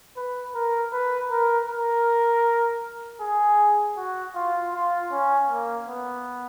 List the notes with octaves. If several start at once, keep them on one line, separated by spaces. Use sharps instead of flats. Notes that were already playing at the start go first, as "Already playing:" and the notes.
B4
A#4
B4
A#4
A#4
G#4
F#4
F4
F4
C#4
A#3
B3